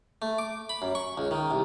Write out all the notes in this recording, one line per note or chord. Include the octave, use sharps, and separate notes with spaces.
A3
D6
B5
F#2
C#6
C#2
D#3
C2